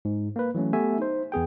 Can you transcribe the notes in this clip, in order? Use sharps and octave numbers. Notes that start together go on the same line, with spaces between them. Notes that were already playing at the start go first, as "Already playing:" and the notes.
G#2
A#3 B4
E3 F#3 A3 C#4
A3 B3 G4 B4 E5 G#5
D#4 C5
E2 B3 G#4 G5